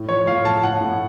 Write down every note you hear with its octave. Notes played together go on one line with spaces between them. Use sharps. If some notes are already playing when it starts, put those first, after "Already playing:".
Already playing: A2
F3 C#5
A2 F5
A2 A5
A2 F#5
A2